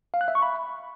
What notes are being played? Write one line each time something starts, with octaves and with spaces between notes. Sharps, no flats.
F5
F#6
E5
C#6
B5